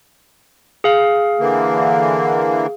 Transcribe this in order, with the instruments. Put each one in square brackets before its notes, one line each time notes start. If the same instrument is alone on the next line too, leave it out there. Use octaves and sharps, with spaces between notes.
[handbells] G#4 F5
[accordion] D3 E3 A#3